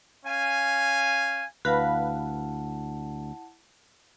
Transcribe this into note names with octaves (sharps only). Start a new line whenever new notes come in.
C#4 F5 G#5
D2 E4 B4 F5 F#5 A5 B5 A#6